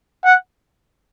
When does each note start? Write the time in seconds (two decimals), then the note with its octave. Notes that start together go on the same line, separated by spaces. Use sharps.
0.24 F#5